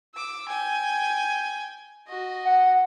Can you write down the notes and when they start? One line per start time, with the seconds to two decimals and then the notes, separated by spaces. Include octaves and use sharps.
0.14 D6 E6
0.49 G5 G#5
2.07 F#4 D#5
2.45 F#5